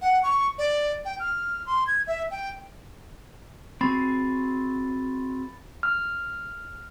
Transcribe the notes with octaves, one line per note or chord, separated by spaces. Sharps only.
F#5
C#6
D5
G5
F6
C6
G#6
E5
G5
C4 F#4 G#4 B5 A6
F6